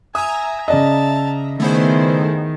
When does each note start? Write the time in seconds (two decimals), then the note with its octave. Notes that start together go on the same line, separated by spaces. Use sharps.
0.15 E5 G#5 A#5 D#6
0.68 C#3 D5 D#5 A5
1.60 D#3 A3 B3 E4 G#4 C5